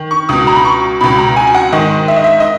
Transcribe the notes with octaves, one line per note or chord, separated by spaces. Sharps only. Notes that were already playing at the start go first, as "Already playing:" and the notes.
Already playing: D#3
C#6
C#2 B2 D#6
A#5
B5
C#6
C#2 B2 B5
A#5
G#5
G#5
F#5
G#2 D#3 D#5
E5
D#5
E5
D#5